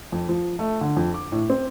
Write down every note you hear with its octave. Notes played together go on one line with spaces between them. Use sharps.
F2
F3
A3
D3
F2
D6
A2
C4